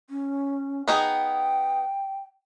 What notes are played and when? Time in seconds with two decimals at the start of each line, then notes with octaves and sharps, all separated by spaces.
0.10 C#4
0.88 B3 D#4 G#4 G5